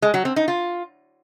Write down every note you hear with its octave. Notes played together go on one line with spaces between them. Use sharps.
G#3
F#3
C4
D#4
F4